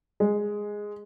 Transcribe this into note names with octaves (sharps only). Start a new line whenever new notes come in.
G#3